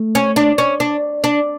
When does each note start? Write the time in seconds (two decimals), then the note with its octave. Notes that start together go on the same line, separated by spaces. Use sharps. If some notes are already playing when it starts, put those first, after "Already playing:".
Already playing: A3
0.15 C#4
0.36 D4
0.58 C#4
0.80 D4
1.24 D4